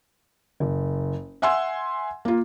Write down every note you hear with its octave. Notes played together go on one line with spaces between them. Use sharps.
F#1
E5 F#5 G#5 C6 E6
A#3 F4